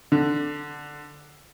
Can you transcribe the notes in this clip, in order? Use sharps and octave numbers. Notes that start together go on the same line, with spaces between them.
D3